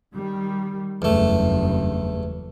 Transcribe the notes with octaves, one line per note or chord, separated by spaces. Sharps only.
D#3 G3
F#1 E2 G2 A3